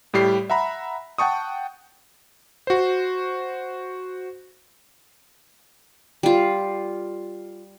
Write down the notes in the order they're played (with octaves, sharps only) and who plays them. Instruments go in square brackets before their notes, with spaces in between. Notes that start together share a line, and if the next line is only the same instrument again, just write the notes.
[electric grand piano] A2 G3 G4 C7
E5 F#5 A#5 B5
F#5 G5 A5 C#6 D#6
F#4 C5
[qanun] G3 F4